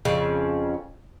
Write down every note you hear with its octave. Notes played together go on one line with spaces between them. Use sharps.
F2 C#3